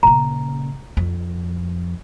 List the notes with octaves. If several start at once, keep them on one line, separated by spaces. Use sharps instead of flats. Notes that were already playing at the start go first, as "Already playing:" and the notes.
A#2 C#3 A#5
F2